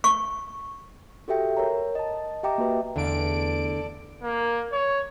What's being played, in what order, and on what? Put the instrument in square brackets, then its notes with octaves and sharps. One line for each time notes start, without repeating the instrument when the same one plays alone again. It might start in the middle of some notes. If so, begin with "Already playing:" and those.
[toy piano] C#6
[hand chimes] F#4 G4 A4 E5 G5
A#4 C#5 A#5
D#5 A5
G4 D#5 E5 G5 A#5 D6
A#3 F#4 B4 E5
[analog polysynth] E2 D7 [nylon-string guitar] D3 A3 F5 [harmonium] A4 D5
[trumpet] A#3
C#5